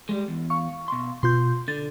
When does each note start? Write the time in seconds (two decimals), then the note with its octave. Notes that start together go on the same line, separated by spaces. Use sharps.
0.09 G3 G#3
0.28 E2
0.50 F5 C#6
0.88 B2 C6
1.23 B2 F4 C6 G6
1.68 D3 A6